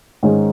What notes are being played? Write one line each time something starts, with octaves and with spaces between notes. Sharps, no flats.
G#2 D#3 G#3 C#4